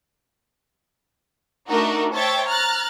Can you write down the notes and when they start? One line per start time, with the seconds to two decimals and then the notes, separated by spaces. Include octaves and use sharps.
1.68 A3 D4 D#4 F#4 A#4
2.15 C5 C#5 E5 G5 A5 A6
2.48 A#5 F6 F#6 A6